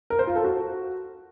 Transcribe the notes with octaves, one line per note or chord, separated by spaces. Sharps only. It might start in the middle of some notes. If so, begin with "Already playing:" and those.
A#4
C5
F4
A4
F#4